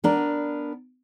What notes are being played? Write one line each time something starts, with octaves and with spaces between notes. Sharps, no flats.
B3 D4 A#4